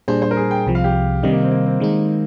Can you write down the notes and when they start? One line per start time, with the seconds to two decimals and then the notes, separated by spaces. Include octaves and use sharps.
0.08 A#2 G3 D4 G#4 C5
0.22 C5
0.31 A#4
0.37 G#4
0.51 G5
0.66 C2 C3 F3
0.75 F5
0.84 G4
1.23 C3 D#3 G3 D#4
1.32 A#3
1.43 C4
1.51 A#3
1.66 C4
1.80 D#3 G#3 D#4